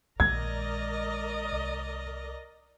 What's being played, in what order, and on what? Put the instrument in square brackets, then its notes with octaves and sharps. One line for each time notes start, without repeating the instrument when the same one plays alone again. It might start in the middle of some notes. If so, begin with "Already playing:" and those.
[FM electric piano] A#1 A#2 [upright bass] D#3 G#3 [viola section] A#4 D5 D#5 [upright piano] G#6
[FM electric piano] C2